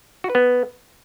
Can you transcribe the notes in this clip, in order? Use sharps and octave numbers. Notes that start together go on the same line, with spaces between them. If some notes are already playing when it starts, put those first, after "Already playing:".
F#4
B4
B3